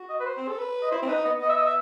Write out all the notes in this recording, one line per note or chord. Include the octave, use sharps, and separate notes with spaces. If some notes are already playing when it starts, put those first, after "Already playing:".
Already playing: F#4
D#5
B4
C5
C4
A4
B4
D#5
E4 C5
C4
D#4 B4
B3 D#5
B3 D#5
E5
D#5
E5